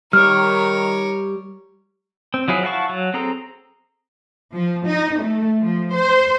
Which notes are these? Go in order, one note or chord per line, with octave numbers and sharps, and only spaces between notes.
D#3 G3 A#4 C#5 F6
C4
F3 F#3 E4 G#4
E4 F5 F#5 A5 C#6
F#3
C4 G#4 A4 A#5
F3
D#4
A3
F3
C5